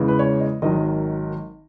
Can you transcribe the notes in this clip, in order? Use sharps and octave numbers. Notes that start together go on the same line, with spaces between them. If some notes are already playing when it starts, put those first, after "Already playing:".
Already playing: E2 C#3 E3 G#3
B4
C#5
D#5
G#1 D#3 F#3 D#5